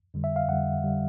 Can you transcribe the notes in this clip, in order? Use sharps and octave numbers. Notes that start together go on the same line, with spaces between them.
F2 D3 G3
E5
F5
F2 D3 G3 F#5
D3 G3